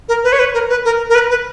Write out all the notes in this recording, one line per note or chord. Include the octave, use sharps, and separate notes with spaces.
A#4
B4
C#5
B4
A#4
B4
A#4
A#4
B4
B4